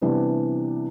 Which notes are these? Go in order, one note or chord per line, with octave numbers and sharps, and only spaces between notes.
C3 E3 G3 B3 D4